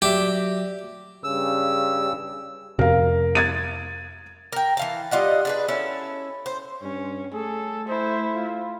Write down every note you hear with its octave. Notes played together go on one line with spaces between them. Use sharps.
F#3 G4 D5 E5
G2 C#3 E6
F2 C3 A#4 F5
G#6 A6 D#7
A#4 G5
E3 F5 A5
G3 F4 D#5 F#5
D4 G#4 B4
C#4 E4 A4
C5
G2 C#4
A3 G#4 A4
E4 C5
F4